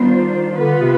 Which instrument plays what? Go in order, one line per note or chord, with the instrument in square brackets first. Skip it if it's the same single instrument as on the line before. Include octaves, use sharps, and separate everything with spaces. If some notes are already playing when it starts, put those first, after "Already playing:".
Already playing: [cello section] D#3 G3 D4 F4 C5 [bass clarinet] B3
[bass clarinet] D3 [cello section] B3 F4 B4
[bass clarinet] C3